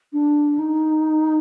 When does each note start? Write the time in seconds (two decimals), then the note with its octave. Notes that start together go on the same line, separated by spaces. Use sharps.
0.13 D4
0.59 D#4